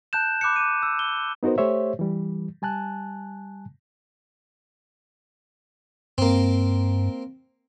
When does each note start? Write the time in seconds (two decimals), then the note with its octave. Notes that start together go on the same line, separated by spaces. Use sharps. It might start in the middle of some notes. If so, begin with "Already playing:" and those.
0.13 A5 F#6 G6 E7
0.41 B5 D6 F#6 G6 C#7
0.56 D6 D#7
0.83 E6
0.99 G7
1.43 B3 D#4 F#4 A#4 C5
1.58 A3 G4 C5 C#5 E5
1.99 E3 G3
2.62 G3 G#5 A5 F#6
6.18 G2 A#3 C4